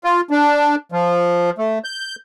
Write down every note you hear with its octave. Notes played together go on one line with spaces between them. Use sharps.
F4
D4
F3
A3
G6